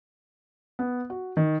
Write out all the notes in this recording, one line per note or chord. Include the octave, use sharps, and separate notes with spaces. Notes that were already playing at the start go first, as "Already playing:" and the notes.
B3
F#4
D#3